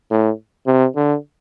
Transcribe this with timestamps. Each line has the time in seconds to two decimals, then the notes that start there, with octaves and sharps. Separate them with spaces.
0.11 A2
0.67 C3
0.96 D3